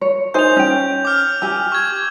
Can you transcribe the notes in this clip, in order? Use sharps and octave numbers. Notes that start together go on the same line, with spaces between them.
C#5
D#4 C5 G#5 G6 F7
C#4 G5
D6 F6
G4 G#5 E6
C#6 G#6